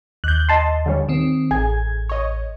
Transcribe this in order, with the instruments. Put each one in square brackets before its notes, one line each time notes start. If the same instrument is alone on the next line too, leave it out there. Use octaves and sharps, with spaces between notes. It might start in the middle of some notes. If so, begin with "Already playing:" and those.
[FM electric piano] D#2 [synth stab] F#6 G6
[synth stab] D#5 A5 C6
D3 G3 C#4
[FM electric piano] D#3 C4
[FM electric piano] A1 G#6 [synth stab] G#4
[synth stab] C#5 D#5